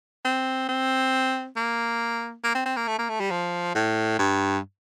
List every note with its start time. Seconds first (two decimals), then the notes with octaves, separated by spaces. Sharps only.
0.25 C4
0.69 C4
1.56 A#3
2.44 A#3
2.55 C4
2.65 C4
2.76 A#3
2.88 A3
2.99 A#3
3.09 A3
3.20 G3
3.31 F3
3.75 A2
4.19 G2